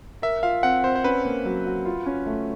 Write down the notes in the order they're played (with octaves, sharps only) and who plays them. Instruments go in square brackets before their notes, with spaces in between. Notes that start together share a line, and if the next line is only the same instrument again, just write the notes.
[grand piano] A#4 [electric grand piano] E5
[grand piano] F4 [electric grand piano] F5
[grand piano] C4 [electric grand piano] F#5
[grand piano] C4 [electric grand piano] C5
[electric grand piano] C5
[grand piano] C#4 [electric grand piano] B4
[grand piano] A#3
F#3
F#4
F4
C#4
A3